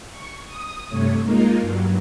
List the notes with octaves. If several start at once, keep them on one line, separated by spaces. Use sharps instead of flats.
C#6
D#6
G2 C3 A3 C#5
G#3 A#3 D#4 F4 A#4
G2 F#3